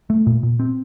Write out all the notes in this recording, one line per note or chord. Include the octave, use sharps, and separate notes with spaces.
A3
A#2
A#2
C4